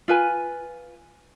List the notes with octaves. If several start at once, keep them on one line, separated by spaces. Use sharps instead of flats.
F4 B4 G#5